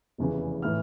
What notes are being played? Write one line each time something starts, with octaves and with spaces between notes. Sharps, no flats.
F1 E2 C#3 E3
A2 E3 F6